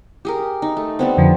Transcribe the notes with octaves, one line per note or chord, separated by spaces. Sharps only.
G4 G#4 A#4
D#4
A3
G3 B3 C4
F2 D3 F3